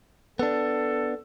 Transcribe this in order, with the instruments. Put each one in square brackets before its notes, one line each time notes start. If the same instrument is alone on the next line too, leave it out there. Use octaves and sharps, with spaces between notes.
[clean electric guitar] B3 D4 [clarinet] A4